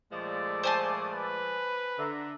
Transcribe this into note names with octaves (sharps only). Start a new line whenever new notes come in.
A#2 F3 G#3 A3 D5
C5 G#5 A5
B4
D3 E5 A#5